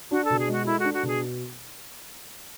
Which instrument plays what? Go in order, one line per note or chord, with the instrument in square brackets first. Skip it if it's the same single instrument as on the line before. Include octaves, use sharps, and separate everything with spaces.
[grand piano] D4 [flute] F#4
[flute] A4
[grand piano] B2
[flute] G#4
[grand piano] G#3 [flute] F#4
[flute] E4 [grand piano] A4
[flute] F#4
[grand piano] D4
[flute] F#4
[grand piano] B2 [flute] G#4